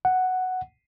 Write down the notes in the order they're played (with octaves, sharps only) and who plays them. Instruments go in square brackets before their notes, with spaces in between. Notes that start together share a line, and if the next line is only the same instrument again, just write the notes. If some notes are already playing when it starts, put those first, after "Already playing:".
[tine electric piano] F#5